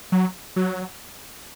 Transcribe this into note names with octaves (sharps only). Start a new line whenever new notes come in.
F#3
F#3